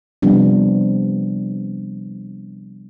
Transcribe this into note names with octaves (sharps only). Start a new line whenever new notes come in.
C3 F3 G3 B3 C4 D4